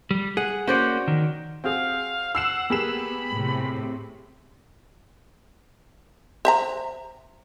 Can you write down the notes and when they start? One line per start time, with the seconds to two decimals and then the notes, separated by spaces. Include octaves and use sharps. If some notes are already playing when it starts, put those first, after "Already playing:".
0.11 G3
0.37 G#4 F#5
0.67 A#3 C#4 F#4 C5 D5
1.08 D#3
1.64 C4 F#4 G#4 F5
2.35 F#5 E6 C7 E7
2.70 A#3 B3 G4 G#4 B5 E7
3.31 A2 C3
6.45 C5 E5 A#5